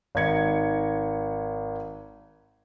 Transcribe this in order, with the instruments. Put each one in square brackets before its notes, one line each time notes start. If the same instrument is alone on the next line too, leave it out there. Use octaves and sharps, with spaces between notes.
[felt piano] G#1 D#4 G#6 C#7